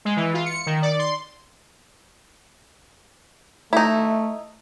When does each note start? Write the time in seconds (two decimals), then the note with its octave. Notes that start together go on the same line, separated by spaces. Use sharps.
0.05 G#3
0.16 E3
0.34 F4
0.46 C#7
0.66 D#3
0.82 D5
0.99 C6
3.73 A3 D#4 E4